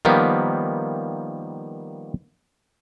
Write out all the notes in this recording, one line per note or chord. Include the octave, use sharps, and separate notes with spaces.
D#3 F3 G3 A#3 B3